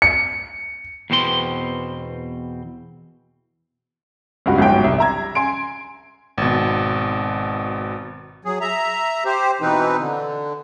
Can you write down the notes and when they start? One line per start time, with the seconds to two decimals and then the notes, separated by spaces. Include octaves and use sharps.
0.02 C#7
1.10 E2 B2 C4 G4 C6
4.46 C#2 G2 F#4
4.58 G1 G#2 F#3 G5
4.84 C2
4.98 E5 A#5 G#6
5.35 G#5 C6 D7
6.38 G#1 B2
8.45 F#3 G#4
8.61 E5 A#5
9.25 G4 C5
9.61 B2 E3 C4 D#4 B4
9.99 D3